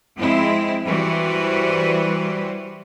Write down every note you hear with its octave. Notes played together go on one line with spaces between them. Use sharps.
F3 G#3 C4 E4
E3 G3 F#4 B4 C5